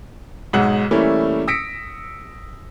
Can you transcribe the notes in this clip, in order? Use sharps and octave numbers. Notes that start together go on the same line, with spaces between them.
B1 G#2 G#3 F#5 E6 F#7
E3 G3 A3 A#3 C#4 E4
D#6 E6 A#6 B6 C#7 D7